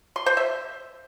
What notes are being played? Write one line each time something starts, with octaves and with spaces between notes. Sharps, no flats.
C6
C5
E5